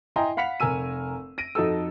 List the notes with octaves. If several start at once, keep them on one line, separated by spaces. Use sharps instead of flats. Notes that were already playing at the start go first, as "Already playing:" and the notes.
E4 D#5 G5 G#5 A#5 C6
F5 F#5 B5 B6 C#7 F7
F1 A#4 G#5 E6 D#7
A#6 D7 D#7
F2 D#4 F#4 A4 E6